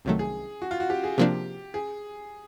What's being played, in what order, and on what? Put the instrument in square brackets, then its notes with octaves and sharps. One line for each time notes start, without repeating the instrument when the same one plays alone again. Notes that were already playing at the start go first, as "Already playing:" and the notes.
[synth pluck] C2 C3 D#3 F#3 A3
[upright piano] G#4
F#4
F4
F#4
G4
G#4
[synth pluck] C3 F3 A#3 D4 [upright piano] G4
[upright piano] G#4